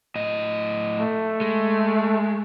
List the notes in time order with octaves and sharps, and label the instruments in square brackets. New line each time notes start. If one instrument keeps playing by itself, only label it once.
[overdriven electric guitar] A2 D#5
[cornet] A3
[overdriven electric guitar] G#3